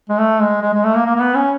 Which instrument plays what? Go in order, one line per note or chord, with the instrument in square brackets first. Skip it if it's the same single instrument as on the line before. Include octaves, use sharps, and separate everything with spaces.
[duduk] G#3
A3
G#3
G#3
G#3
A3
A#3
A#3
A#3
B3
C#4